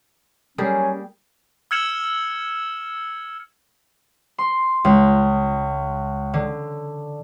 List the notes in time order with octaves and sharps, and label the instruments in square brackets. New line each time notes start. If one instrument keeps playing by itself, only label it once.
[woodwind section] F#3 C#4 [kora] G3 A#3 G#4
[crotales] E6 F6 G#6 C#7 E7 F#7
[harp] C6
C#2
D3